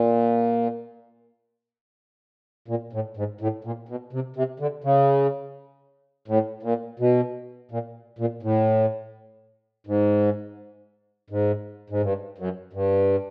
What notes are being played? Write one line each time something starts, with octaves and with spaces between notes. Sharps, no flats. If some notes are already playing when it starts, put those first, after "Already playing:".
Already playing: A#2
A#2
A2
G#2
A2
A#2
B2
C3
C3
D3
C#3
A2
A#2
B2
A#2
A#2
A2
G#2
G#2
G#2
G2
F#2
G2